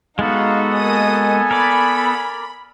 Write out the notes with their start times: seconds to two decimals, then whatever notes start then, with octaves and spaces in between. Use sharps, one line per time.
0.19 G#3 B3 D#4 F#4 A4 F5
0.75 A#3 D#5 G#5 D#6
1.51 A#4 D5 B5